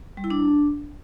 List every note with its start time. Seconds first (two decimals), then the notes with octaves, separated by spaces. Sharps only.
0.17 G3
0.24 E4
0.30 D4